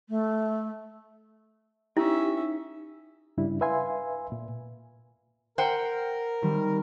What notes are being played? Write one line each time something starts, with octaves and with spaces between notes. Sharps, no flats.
A3
C#4 D#4 E4 G4 E5
G2 C#3 G3 D4 E4
B4 E5 F5 G#5 C6
A#2
A#4 C5 F#5 G5
D#3 G3 C4